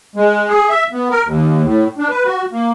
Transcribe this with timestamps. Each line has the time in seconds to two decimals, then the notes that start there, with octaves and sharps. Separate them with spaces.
0.16 G#3
0.49 G#4
0.69 E5
0.92 B3
1.11 A#4
1.25 D#2
1.63 A2
1.98 D4
2.10 B4
2.25 F#4
2.52 A#3